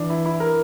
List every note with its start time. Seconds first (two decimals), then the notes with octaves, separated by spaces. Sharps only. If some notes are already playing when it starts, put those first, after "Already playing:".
Already playing: E3 D4
0.10 E4
0.26 E4
0.40 A#4